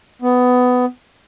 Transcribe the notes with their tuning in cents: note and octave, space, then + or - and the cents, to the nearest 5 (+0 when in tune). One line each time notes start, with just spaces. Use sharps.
B3 +15